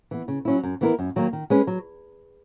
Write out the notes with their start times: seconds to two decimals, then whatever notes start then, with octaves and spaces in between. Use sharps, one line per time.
0.11 E3 B3
0.28 C#3
0.45 F#3 C#4 E4
0.63 F#2
0.81 E3 B3 E4 A#4
0.99 F#2
1.16 D#3 F#3 A#3
1.33 D#3
1.50 G#3 C#4 G#4 B4
1.67 F#3